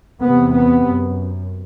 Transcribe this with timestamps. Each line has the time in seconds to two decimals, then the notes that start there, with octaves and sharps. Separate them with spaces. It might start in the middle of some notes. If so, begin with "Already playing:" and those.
0.23 E2 C3 B3
0.54 B3
0.84 F#2